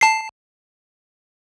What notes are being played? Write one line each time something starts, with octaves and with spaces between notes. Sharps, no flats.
A5 C7